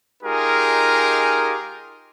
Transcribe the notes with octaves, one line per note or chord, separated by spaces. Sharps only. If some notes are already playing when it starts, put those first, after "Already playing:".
G#3 D#4 F4 G4 G#4 A#4